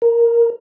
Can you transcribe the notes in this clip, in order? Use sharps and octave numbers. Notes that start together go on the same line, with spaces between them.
A#4